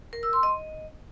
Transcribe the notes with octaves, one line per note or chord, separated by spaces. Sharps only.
A#4
E6
C6
D#5